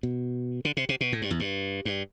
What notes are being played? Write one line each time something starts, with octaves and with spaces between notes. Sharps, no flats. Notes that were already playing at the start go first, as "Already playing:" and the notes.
B2
D3
C3
C3
B2
A2
G2
E2
G2
G2